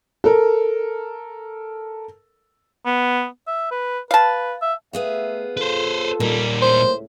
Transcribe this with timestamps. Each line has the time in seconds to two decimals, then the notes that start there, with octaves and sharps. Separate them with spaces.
0.24 A4 A#4
2.86 B3
3.47 E5
3.71 B4
4.11 B4 F5 A5
4.62 E5
4.93 A3 B3 G#4 E5 F5
5.57 F4 A4 B4 C5
6.20 A#2 G3 A#3
6.62 C#2 A2 C5